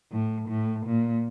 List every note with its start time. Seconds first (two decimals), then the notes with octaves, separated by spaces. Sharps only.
0.11 A2
0.49 A2
0.87 A#2